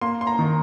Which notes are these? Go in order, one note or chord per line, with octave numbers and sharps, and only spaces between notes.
A#3 C6
C6
A#5
D#3